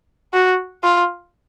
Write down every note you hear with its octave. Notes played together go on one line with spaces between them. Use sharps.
F#4
F4